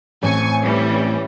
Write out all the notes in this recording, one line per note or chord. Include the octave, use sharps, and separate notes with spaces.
A1 A2 C4 G#5 C#6
E3 G3 C#4